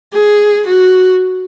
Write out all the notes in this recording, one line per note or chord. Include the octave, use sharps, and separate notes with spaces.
G#4
F#4